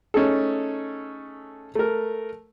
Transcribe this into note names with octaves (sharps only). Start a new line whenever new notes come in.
A3 C#4 D#4 G#4 A4
A3 A#4